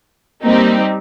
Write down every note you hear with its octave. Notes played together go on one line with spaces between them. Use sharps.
G3 A#3 C4 D#4 G4